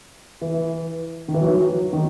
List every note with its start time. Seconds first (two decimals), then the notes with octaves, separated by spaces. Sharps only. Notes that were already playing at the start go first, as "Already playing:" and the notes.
0.41 E3
1.28 D#3
1.34 E3
1.42 F#3
1.93 D#3